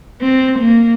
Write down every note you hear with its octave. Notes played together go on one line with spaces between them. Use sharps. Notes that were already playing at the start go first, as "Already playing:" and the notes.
C4
A#3